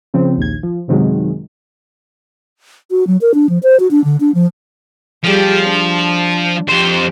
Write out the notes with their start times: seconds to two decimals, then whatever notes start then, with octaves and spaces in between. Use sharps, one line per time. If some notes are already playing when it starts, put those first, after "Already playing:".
0.14 C#3 F3 C4
0.37 A#1 D#2 G#6
0.63 F3
0.88 F#2 C3 D#3 F#3 G#3
2.91 F#4
3.07 F#3
3.21 A#4
3.34 D4
3.49 F3
3.63 C5
3.80 F#4
3.91 D4
4.04 D3
4.20 D4
4.34 F3
5.23 F3 G3 G4 G#4
5.64 D4
6.69 F2 G4 C5